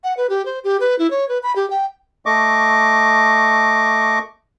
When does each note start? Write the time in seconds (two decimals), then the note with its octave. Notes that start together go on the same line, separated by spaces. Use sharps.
0.04 F#5
0.17 B4
0.30 G4
0.45 C5
0.64 G4
0.80 B4
0.99 E4
1.11 C#5
1.29 B4
1.43 B5
1.56 G4
1.70 G5
2.26 A3 D#5 C#6 D6